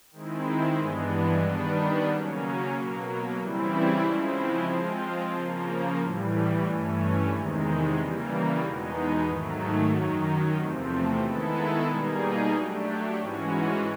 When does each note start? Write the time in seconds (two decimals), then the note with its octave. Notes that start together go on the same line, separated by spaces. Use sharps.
0.11 D#3 G#3 C4 E4
0.77 G2 E3 G#3 B3 D4
1.43 D#3 G3 B3 D4
2.08 C#3 F#3 A#3 C#4
2.72 B2 F#3 A#3
3.39 C#3 E3 G3 C4 E4
4.03 C#3 F3 G#3 C4 E4
4.68 F3 G#3 C4 F4
5.34 C#3 F3 A#3
5.99 A2 E3 G3
6.64 G2 E3 A3 C#4
7.30 E2 C3 D#3 G#3
7.95 C#3 E3 G3 A#3
8.60 E2 B2 G#3 B3 D#4
9.25 G#2 D#3 F#3 A3
9.90 F#2 D#3 F#3
10.56 E2 C3 F3 A3 C4
11.20 D#3 G#3 B3 E4 A4
11.86 B2 G3 A#3 D#4 G#4
12.51 F#3 A3 D4 G4
13.16 G#2 E3 G#3 C#4 F#4